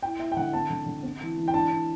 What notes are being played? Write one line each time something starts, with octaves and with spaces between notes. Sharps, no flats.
E4 G5
E4 E5
G5
D3 F#5
C4 A5
D3
D3
C4
E3
E3
G5
D4 A5
D4